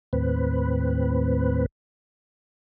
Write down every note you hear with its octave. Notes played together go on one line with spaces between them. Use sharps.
D#2 A2 C4 B4